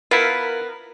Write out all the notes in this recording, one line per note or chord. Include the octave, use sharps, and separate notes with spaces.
B3 E4 F4 A#4